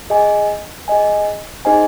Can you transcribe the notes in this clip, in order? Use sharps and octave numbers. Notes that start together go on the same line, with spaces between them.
G#4 D#5 G#5
G#4 D#5 G#5
D#4 G#4 C5 D#5 G#5